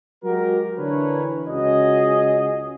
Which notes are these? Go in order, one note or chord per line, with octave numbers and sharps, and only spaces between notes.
F#3 G#3 F#4 G4 A#4
D3 E3 D4 A#4 B4 C#5
C#2 C#4 F#4 G#4 D#5